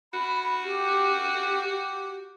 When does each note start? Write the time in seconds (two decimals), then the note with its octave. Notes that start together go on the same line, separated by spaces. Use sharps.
0.13 F#4 B5
0.64 G4
1.68 G4